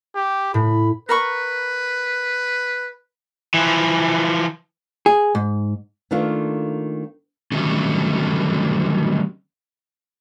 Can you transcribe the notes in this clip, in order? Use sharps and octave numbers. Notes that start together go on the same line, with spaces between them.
G4
A2 B5
A#4 B4 B5 C#6
E3 F3
G#4
G#2
D#3 A3 A#3 D4 F4
D3 D#3 F#3 G3 A3 C#4